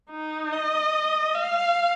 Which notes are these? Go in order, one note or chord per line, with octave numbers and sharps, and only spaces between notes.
D#4
D#5
F5